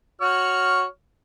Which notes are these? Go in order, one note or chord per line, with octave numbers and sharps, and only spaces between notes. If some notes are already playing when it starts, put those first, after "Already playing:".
F#4 C#5 F6